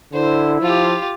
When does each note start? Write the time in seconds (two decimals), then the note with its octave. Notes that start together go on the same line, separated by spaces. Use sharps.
0.13 D3 E4 C5
0.61 F3 F4 G4